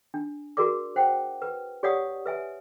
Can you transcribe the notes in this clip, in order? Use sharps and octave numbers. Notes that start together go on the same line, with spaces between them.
D4
F#4 G#4 A#4 D5 D6
C5 F#5 G5
B4
G4 C#5 D5 F5 F#5 D#6
B4 E5 G#5